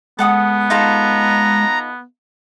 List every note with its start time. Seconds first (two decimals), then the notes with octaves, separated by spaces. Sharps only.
0.19 G#3 B3 A4 F#5 D#6
0.70 D#4 F4 A4 A#5